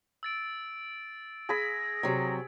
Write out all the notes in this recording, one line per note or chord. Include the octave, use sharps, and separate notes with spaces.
E6 A6 D7
G#4 B5 A#6
C3 F#3